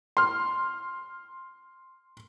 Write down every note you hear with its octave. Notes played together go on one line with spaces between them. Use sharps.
C6 F6